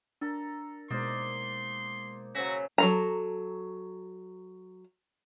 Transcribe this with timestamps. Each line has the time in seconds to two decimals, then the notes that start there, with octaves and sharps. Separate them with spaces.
0.21 D4 A4 A#4
0.90 B2 G#3 A#3 D#4 C5 D5 C6
2.35 C#3 F#3 F#4 C5 E6 B6
2.78 F#3 A4 A#5